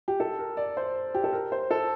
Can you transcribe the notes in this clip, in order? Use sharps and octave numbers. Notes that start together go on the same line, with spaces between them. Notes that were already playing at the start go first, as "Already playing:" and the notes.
G4
A4
A#4
D5
C5
G4
A4
A#4
C5
A4